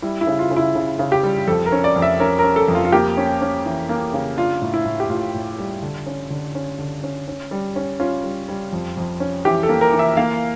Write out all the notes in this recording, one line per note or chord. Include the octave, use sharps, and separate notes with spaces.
G3 E4
E4
C#3
F4
C#3
E4
C#3
C#3
G4
G3
F2 A4
A#4
C#4
D5
F2
E5
C#4 A#4
A#4
C#4
A4
F2
F4
F4
A#3 G4
C#4
C#4
E3
A#3
C#3
D4 F4
A2
E4
A2
G4
A2 F4
A2
G3
D3
C#4
D3
C#4
D3
C#4
C#4
G3
C#4
C#4 F4
G3
G3
F2
F2
C#4
E3 G4
A4
A#3
A#4
E3
E5
A#3 F5